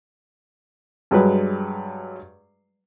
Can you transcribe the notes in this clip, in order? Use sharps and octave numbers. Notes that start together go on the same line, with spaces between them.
G2 F#3 G#3 B4